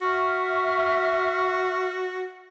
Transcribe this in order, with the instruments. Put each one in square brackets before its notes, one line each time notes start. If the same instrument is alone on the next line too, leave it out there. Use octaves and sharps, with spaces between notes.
[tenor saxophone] F#4 [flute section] E5 C#6 F6